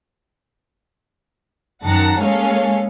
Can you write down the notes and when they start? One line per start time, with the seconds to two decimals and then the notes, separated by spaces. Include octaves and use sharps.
1.83 F#2 D#3 F#5 A5 A#5 C#7
2.18 G#3 A#3 C#4 A4 C#5 F5